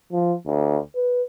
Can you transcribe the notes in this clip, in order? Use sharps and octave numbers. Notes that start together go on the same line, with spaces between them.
F3
D2
B4